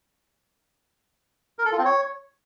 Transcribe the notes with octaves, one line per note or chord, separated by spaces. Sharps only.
A#4
A4
F4
C4
C#5